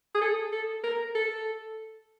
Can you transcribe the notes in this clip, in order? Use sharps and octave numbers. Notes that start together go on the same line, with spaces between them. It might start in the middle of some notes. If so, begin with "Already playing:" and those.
G#4
A4
A4
A#4
A4